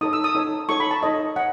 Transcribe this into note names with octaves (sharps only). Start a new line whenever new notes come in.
D#4 A4 C#5 D#6
E6
D#6
D#4 A4 C#5
D#4 A4 C#5 C#6
B5
A5
D#4 A4 C#5 D#5
C#5 F#5